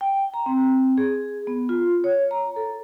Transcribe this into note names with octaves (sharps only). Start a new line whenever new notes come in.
G5
A#5
C4
G#4
B3
F4
C#5
A#5
A4